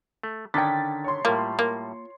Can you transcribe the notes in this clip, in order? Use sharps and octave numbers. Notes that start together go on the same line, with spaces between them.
A3
D3 D#3 C#4 D4 G5 A6 B6
C#5 C6
A2 G3 A#3 F4
A#3